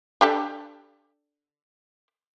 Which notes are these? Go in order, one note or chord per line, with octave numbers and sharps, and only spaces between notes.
D4 G4 A4